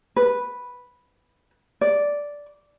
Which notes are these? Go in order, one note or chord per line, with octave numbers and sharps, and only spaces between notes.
B4
D5